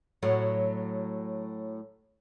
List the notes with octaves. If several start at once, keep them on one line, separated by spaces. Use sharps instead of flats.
A2 F#3